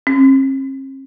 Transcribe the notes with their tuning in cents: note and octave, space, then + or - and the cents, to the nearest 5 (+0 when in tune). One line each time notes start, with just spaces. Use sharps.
C4 +45